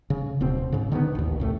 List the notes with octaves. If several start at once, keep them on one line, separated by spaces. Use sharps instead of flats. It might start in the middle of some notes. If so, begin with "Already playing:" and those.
C#3
D1 B2 C4
G#2 C#3
D3 D#3 A#3 B3
A1 D#2
C2 A2 A3